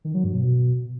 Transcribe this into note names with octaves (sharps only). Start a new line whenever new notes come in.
D#3
F#3
G2
B2